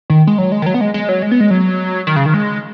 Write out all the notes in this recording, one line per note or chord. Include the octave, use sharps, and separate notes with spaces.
D#3
G#3
F#3
G#3
D#3
F#3
B3
G#3
G#3
F#3
G#3
B3
G#3
F#3
D#3
C#3
D#3
G#3